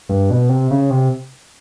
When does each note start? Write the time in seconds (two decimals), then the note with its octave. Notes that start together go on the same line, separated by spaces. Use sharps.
0.09 G2
0.30 B2
0.49 C3
0.71 C#3
0.90 C3